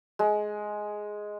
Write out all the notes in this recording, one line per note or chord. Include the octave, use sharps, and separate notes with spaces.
G#3